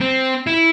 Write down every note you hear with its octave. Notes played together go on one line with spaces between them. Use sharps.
C4
E4